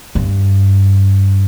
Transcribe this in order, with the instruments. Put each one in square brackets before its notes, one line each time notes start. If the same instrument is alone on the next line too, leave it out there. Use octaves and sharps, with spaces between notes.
[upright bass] G2